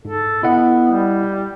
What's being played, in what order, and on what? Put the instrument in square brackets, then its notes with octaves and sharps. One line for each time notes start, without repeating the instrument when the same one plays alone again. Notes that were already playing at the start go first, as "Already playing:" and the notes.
[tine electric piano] G#2 [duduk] A4
[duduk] B3 [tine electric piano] E4 D#5 F#5
[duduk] G3